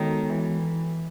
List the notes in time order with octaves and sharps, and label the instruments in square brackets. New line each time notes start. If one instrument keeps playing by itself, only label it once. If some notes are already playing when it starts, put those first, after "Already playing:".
Already playing: [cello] D#3 [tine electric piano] G#3 B3 F#4 A4 C#5
[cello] E3